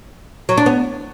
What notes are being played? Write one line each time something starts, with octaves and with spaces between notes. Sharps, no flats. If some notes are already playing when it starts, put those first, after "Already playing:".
F#3
D4
B3